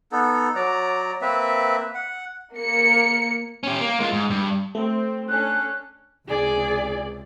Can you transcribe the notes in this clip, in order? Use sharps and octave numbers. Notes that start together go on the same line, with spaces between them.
B3 D#4 A4
F#3 D5 A#5
A#3 C4 B4 E5
F#5
A#3 C#7
C#4 G4
A#3
G#3 F4
G#2
G2
A3 C4
C#4 D4 A4 F#6
C#2 C3 G#4 D5